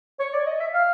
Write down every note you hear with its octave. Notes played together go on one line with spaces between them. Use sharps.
C#5
D5
D#5
E5
F5